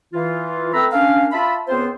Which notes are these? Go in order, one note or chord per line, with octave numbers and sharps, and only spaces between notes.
E3 F4
A3 C4 B4 A#5 B5 E6
A#3 C#4 D4 F5
F4 E5 A5 B5
C#2 B3 C4 F4 C5